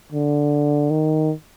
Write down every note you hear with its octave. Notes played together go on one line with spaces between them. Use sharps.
D3
D#3